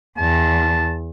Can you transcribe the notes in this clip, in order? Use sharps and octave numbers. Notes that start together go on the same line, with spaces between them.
E2 A5